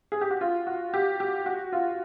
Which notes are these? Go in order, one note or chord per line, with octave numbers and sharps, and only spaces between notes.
G#4
G4
F#4
F4
F#4
G4
G4
F#4
F4